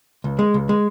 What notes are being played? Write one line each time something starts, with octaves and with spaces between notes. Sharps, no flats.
C#2
G#3
C#2
G#3